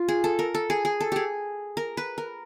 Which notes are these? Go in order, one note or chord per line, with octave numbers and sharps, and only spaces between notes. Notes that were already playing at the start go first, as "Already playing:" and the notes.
Already playing: F4
G#4
A4
A#4
A4
G#4
G#4
A4
G4 G#4
A#4
B4
A#4